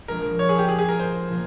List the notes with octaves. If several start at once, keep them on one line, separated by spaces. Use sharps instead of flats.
A#1 A#2 G#3 A#4
C#5
G#4
G4
G#4
G#4
A#4
C5
A#2 F3 A#3